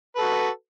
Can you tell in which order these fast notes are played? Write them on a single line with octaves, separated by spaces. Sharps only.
B4 A4 F#4